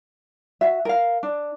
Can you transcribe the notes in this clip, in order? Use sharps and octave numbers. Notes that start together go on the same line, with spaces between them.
F#4 E5
A#4 F5
D4